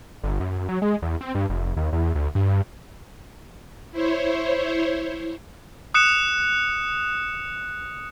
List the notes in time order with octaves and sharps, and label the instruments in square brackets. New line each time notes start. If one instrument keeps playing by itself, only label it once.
[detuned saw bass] G1
F#2
F#3
G#3
E2
C4
G2
F1
D#2
E2
D2
G2
[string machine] E4 C5 C#5
[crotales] D#6 F#6 C#7 E7